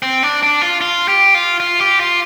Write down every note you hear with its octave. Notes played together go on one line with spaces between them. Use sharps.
C4
D4
D4
F4
F4
G4
F4
F4
G4
F4